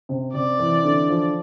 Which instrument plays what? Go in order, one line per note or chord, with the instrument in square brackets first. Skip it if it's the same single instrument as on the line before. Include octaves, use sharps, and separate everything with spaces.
[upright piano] C3
[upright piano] C3 [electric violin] D5
[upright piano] E3
D3
F3